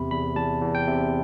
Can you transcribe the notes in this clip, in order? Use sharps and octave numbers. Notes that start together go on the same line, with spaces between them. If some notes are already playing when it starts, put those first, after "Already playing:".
Already playing: E2 C3 B5
E2 B5
E2 A5
E2
G5
C3